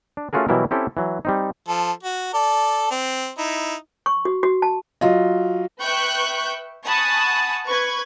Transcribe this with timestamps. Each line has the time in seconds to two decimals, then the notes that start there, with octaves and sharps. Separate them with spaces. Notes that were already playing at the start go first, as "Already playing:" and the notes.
0.17 D4
0.33 A3 C#4 F4 F#4 G#4 A#4
0.48 B2 E3 F#3 G3 E4 A#4
0.71 C4 C#4 E4 G4 A4
0.97 E3 F#3
1.25 G3 C4 D#4
1.68 F3 A4
2.03 F#4
2.34 A4 D5
2.91 C4
3.38 D#4 E4
4.06 C#6
4.25 F#4
4.43 F#4
4.62 A5
5.01 F#3 F4 D#5
5.81 B4 E5 G5 C#6 F#6 G6
6.85 F#5 G#5 A5 B5 C#6 D#6
7.68 B4 C#6 G#6